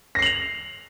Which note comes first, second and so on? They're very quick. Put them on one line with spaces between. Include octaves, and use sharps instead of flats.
A#6 C7 F#7 F7